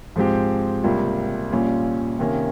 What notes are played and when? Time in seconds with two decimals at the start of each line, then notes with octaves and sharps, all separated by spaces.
0.16 G#2 F3 G#3 C4 G4
0.84 C#2 C3 G3 A#3
1.51 A#1 A#2 G3 C#4 F4
2.19 C3 D#3 A#3 C#4